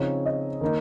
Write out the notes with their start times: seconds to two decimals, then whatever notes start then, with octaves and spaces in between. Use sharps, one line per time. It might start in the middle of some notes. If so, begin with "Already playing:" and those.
Already playing: C#3 F3 C4 D#4 C#5
0.26 D#5
0.61 D#3 A#3 D#4